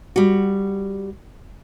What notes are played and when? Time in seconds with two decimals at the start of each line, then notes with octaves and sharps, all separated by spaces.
0.16 G3 F#4